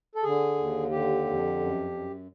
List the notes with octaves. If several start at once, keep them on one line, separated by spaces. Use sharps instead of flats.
A4
D3 G#4
D#2
D3 G4
F2
F#2
F#2